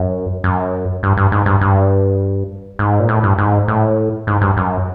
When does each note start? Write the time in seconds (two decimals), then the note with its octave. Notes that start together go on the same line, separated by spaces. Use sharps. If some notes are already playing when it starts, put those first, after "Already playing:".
Already playing: F#2
0.44 F#2
1.03 G2
1.17 G2
1.32 G#2
1.46 G2
1.61 G2
2.79 G#2
2.99 A#2
3.09 A2
3.23 G2
3.38 G#2
3.68 A2
4.27 G#2
4.41 G2
4.57 F#2